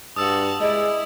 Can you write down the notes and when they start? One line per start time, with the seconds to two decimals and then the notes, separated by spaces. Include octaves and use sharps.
0.16 G2 F#4 A5 D#6 E6
0.60 G#3 E4 D5 D#5